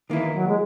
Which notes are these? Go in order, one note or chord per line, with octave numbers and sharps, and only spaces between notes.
D#3 E3 A#3 E4
F#3
G#3